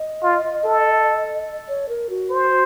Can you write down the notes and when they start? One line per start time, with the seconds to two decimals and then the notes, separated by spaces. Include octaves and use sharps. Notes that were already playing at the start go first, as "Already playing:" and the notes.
Already playing: D#5
0.23 F4
0.65 A4
1.68 C#5
1.89 A#4
2.09 F#4
2.30 C5